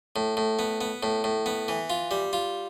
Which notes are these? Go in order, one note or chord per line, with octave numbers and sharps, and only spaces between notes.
A2
A2
B3
B3
A2
A2
B3
E3
F4
G3
F4